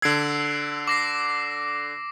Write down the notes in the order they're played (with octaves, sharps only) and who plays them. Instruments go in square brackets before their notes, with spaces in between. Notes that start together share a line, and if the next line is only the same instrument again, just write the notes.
[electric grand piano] D3 G#6 [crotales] E6 C7 D7
[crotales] D6 A#6 C7